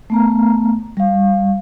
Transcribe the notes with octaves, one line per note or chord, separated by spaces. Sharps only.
A3 B3 A#5
G3 F5